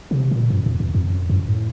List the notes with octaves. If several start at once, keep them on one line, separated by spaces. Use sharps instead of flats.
C3
A#2
F#2
F2
F2
F2
F#2
F#2
A2